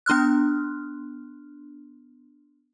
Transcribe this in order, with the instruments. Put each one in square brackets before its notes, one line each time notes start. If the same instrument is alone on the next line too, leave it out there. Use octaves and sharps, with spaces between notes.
[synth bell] B3 D4 C6 F6 F#6